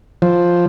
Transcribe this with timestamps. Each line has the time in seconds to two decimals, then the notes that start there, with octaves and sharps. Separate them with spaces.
0.22 F3